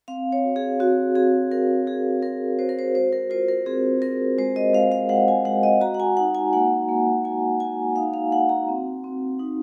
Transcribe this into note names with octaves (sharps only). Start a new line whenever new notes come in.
C4 F5
C#5
F#4
G#4
C4 F#4
C4 G#4
F#4 A#4
F#4 G#4
C4 A#4
F#4 C5
A#4
C5
G#3 C5
A#4
F4 C5
A#4
C4 G#4
C4 A#4
G#3 C5
D#5
G#3 F5
F5
G#3 F#5
G#5
G#3 F#5
D#5
F#4 A#5
F#5
G#5
D#4 F#5
G#5
A#3 F#5
A#3
A#3 G#5
F#4 G#5
D#4 F5
F5
F#4 F#5
A#5
C4
C4
D#4